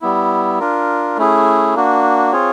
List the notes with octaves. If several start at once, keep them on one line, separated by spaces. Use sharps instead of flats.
G3 B3 E4
D4 F4 A#4
A3 C#4 E4 G#4
A#3 D4 F#4
C4 F4 G#4 C#5